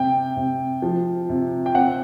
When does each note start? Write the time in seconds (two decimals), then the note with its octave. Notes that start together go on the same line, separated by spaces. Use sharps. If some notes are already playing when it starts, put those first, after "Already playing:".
Already playing: C3 G5
0.37 C3
0.82 F3
1.29 C3
1.66 G5
1.74 C4 F#5